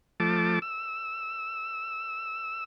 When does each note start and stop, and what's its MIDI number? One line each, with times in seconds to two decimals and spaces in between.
0.20 0.59 53
0.20 0.59 57
0.20 0.59 81
0.20 0.59 86
0.62 2.64 88